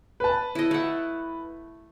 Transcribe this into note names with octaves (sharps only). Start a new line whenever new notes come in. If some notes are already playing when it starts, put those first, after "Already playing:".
B4 A5
E4 D#5
A3 F#5